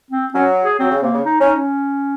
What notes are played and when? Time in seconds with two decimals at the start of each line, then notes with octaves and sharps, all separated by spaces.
0.11 C4
0.34 F#3 C#4
0.65 G#4
0.79 F#3 C4
0.91 C#3
1.02 C3 A#3
1.14 C#3
1.25 D#4
1.41 C#4 D#4
1.56 C#4